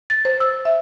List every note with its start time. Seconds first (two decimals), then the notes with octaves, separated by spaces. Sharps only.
0.10 A6
0.25 C5
0.40 E6
0.65 E5